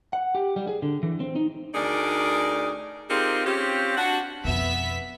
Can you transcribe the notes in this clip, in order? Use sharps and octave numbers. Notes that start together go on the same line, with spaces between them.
F#5
G4
G3
G#4
D3
E3
C4
D#4
D2 D#4 G#4 A#4 D5
C4 D#4 F4 G4 G#4 A#4
C4 C#4 F4 G4
D4 F#4 F#5
F2 B2 B3 E5 B6